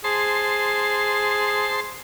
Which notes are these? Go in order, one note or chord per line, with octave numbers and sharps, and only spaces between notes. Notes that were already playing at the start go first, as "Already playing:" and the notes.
G#4 C5 A5 C6